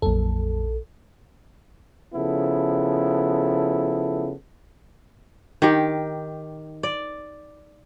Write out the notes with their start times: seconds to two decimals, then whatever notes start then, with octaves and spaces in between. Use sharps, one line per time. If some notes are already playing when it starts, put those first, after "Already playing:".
0.02 A#1 F2 F#3 A#3 A4
2.14 C#3 F3 B3 E4 A4
5.62 D#3 G4
6.83 D5